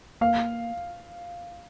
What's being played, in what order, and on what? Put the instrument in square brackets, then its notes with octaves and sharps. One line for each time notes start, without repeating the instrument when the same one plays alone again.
[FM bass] A#3 [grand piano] F5